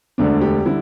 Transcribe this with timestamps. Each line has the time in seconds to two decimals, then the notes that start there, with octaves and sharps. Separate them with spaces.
0.18 E1 D2 D3 A3 D4
0.41 G4
0.66 D3 G3 E4